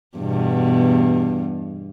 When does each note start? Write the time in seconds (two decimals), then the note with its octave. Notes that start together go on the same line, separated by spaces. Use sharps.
0.18 E2 G2 B2